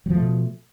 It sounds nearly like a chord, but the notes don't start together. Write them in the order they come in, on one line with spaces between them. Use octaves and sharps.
F#3 F3 A3 B2